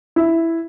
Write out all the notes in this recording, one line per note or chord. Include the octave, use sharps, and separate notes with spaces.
E4